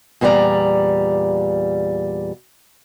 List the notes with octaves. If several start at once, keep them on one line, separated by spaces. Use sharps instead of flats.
E2 A#2 G3 G4 D5 A#5